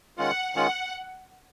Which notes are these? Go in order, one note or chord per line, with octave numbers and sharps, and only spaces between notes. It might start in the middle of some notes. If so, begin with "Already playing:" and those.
D#3 G#3 C#4 F4 F#5
D#3 G#3 C#4 F4 F#5